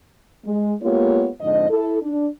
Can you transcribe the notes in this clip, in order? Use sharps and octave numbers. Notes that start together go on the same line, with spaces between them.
G#3
G#3 A#3 B3 F4 G4 C#5
F2 G#2 D3 D#5
E4 A4
D4